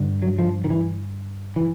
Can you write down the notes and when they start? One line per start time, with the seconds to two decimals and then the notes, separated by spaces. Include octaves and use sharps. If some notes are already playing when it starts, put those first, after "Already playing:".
Already playing: G2 D3
0.22 F#3
0.39 F3
0.64 D#3
0.70 E3
1.56 E3